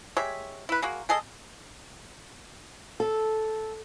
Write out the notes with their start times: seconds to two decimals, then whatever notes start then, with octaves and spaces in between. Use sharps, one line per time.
0.17 G#3 G4 C#5 E5
0.69 E4 B4
0.82 G#3 A#3 F#4
1.09 G#3 G#4 A4 D#5
3.00 A4